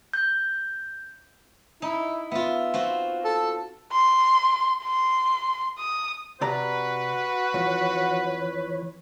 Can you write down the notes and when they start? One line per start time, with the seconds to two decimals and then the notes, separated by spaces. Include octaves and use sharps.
0.13 G6
1.82 D#4 E4
2.31 B3 F4 E5
2.74 C4 F4 F#4
3.24 A4
3.92 C6
4.84 C6
5.78 D#6
6.41 C3 F#4 B4 D5 A#5
7.54 F2 E3 F3 C#5